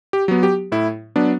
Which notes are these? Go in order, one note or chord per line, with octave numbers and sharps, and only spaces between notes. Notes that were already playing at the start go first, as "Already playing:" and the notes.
G4
F#3 B3
G4
A2 E4
F#3 B3 D4